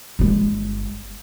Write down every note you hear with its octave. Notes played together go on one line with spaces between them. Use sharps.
G1 G#3